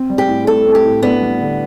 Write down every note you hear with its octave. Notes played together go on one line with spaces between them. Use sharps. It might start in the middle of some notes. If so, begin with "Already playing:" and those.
Already playing: C4
G3
G4
A2
A2 A4
C4
G4
A2
B3 D4
G3
D3